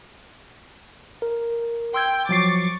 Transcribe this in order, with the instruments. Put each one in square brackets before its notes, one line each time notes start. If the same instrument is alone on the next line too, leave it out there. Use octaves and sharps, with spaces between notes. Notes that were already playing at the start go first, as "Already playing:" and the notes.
[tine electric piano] A#4
[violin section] G5 G6 [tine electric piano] C6 E6 G#6
[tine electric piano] F3 F#3 C7 [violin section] C#6 D6 A6